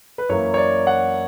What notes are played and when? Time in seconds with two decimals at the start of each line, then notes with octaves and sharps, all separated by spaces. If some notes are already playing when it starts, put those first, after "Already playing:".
0.18 B4
0.29 F#2 E3 A#3 E4 C#5
0.54 C#5
0.57 D5
0.87 F#5